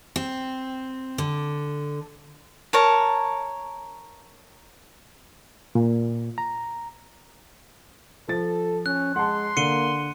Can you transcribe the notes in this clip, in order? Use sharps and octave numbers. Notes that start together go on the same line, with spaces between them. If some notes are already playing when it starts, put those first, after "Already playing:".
C4
D3
A#4 C#5 A5
A#2
A#5
F3 A4 A6
C#4 F#6
G#3 F#5 A5 C6
D3 A#3 C#7 D#7 G7